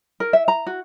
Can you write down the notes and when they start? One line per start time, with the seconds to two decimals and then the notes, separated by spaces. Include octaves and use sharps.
0.20 A#4
0.33 E5
0.48 A#5
0.66 F#4